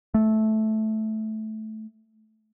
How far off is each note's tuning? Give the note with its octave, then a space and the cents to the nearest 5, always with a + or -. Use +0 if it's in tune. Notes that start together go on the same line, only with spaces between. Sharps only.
A3 -10